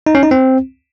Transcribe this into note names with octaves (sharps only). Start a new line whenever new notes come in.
D#4
C#4
D#4
C4